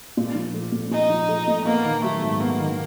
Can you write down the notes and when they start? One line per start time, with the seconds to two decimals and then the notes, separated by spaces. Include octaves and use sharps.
0.17 A#2
0.35 F3
0.54 A3
0.72 A#2
0.91 A#2 D#4
1.10 F3
1.29 A3
1.47 A#2
1.66 A#3 B3
1.85 D#3
2.04 F#3 A3
2.22 G#2
2.41 A#3 B3
2.60 D#3